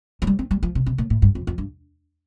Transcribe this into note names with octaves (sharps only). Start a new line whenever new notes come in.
F3
G3
C4
G3
F3
C3
C3
A2
A2
G2
F2
F2
G2